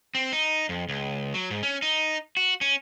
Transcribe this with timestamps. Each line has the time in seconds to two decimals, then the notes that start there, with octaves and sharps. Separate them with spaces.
0.15 C4
0.32 D#4
0.69 F2
0.89 C#2
1.34 F#3
1.50 G#2
1.63 C#4
1.82 D#4
2.37 F#4
2.61 C#4